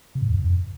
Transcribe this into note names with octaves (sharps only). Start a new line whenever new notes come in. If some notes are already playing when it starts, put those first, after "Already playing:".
C3
G#2
E2
G2
F2